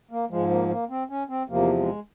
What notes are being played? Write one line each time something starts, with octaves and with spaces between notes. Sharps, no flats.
A#3
G#2 F3 G#3
A#3
A#3
C4
C#4
C4
E2 C3 F3 A#3
G#3